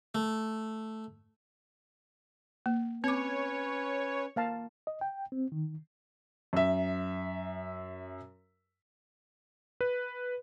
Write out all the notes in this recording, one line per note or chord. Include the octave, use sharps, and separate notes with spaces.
A3
A#3
C4 C#4 B4 C#5 D6
A#3 F5 A5
D#5
G5
C4
D#3
F#2 E5
B4